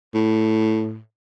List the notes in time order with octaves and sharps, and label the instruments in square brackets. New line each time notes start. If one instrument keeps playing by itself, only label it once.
[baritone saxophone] A2